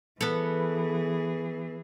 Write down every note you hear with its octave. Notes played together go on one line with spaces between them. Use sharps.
E3 B3 G#4 A4